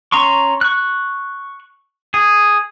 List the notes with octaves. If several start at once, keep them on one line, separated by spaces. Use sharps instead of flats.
C#4 A#5 C6 C#6
C#6 F#6
G#4